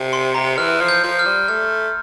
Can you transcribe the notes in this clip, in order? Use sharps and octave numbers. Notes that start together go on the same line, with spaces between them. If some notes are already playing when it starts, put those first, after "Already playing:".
Already playing: C3
C6
A#5
E3 F6
F3
G6
F3
F6
G3
A3 F6